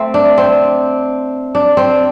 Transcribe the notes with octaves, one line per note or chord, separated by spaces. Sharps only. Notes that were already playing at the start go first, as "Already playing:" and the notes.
Already playing: A3 C4
D4
C4
D4
C4